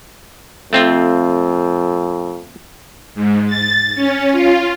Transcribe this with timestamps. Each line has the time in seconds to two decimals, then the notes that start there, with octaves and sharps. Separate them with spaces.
0.73 F2 A3 C4 F4
3.15 G#2
3.47 A6
3.95 C#4
4.32 F4